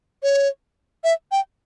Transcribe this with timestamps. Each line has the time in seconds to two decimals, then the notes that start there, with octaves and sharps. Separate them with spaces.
0.23 C#5
1.04 E5
1.32 G5